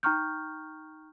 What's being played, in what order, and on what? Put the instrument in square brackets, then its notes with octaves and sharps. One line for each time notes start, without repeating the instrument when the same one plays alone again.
[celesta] D#4 G5 A#5 C#6 F6 G6